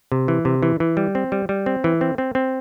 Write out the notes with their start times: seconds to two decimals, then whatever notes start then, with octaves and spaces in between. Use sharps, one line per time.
0.12 C3
0.28 E3
0.45 C3
0.63 E3
0.80 E3
0.97 G3
1.15 C4
1.32 G3
1.49 G3
1.66 C4
1.84 E3
2.01 C4
2.18 C4
2.35 C4